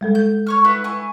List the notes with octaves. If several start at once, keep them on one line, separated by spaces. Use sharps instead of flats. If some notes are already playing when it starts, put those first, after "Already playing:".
G3 G#3 A4
G6
C#5 C#6 F6
E4 F#4 B4
E4 G#5 C#6